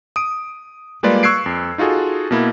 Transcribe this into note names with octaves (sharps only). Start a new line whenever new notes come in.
D#6 D7
G3 G#3 A#3 F4 B4 D5
C#6 E6 F#6 G#6 C7 D7
F2
D#4 F4 F#4 G#4 A4
B2 A#3 E4